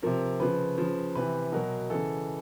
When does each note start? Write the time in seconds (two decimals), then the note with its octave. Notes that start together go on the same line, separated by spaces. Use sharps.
0.03 C3 F3 A#4
0.40 C#3 F3 B4
0.78 C#3 F3
1.15 C3 E3 B4
1.52 B2 F#3 A#4
1.90 C#3 E3 A4